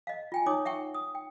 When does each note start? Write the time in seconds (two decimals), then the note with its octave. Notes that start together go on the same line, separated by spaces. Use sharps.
0.07 D#5 F5
0.32 F4 G5 G#5
0.46 D#4 C#5 D6 D#6
0.65 E5 F#5 G5 C#6
0.94 D#6
1.15 G5